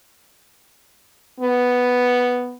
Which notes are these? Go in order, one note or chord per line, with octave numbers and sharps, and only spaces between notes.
B3